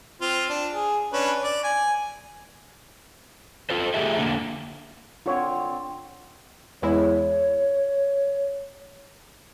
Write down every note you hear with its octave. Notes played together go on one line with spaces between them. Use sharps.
C4 F4
D4
G#4
C#4 D4 B4
D5
G#5
F4 A4 C5
A3 G4 G#4 E5
D3 A#3
D3 C4 F4 C#5
E2 G#3 E4 C#5